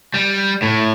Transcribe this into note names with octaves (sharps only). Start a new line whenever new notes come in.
G3
A2